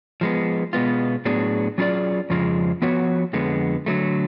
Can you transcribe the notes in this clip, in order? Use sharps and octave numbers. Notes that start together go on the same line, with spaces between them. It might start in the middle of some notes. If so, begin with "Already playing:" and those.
F3 G#3 B3
B2 G#3 B3 F4
A2 F#3 B3 D4 G#4
F#3 C#4 F4 G#4 D5
F2 C#3 F3 G#3
F3 B3 F#4 C#5
F2 D3 G#3 B3
D3 F#3 A3